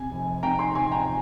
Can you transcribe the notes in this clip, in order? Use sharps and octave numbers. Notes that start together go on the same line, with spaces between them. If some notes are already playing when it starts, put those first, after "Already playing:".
Already playing: C3 G#5
F1
C3 G5 A#5
G#5 C6
F1 G#5 C6
G5 A#5